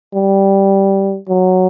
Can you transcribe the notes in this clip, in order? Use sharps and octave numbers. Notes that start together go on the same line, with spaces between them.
G3
F#3